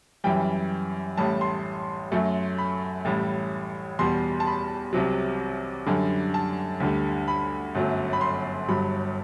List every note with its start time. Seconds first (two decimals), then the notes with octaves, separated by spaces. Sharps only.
0.24 F#2 E3 G3 G5
1.17 A1 A2 G3 A5
1.41 C6
2.12 F#2 F#3 A3
2.58 B5
3.05 A1 A2 G3
3.99 E2 B2 G3 C6
4.40 A5
4.47 B5
4.93 C2 C3 F#3
5.86 F#2 D3 G3
6.34 A5
6.80 D2 D3 G3
7.28 B5
7.75 G1 F#2 F#3 A3
8.13 B5
8.21 C6
8.68 G1 G2 F#3 B5